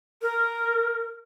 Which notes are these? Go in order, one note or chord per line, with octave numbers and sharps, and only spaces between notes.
A#4